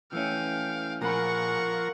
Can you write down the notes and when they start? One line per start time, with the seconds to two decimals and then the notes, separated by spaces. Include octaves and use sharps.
0.13 E3 A3 C#4 F5 G5
1.02 A#2 F3 G#4 A#4 F#5 A#5 B5 C#6